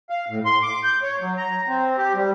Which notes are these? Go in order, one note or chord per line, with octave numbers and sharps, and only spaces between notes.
F5
A2
C6
D6
G6
C#5
F#3
A#5
C4
G4
G3